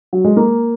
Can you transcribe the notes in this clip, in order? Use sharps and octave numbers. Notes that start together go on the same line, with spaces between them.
F#3
G#3
A#3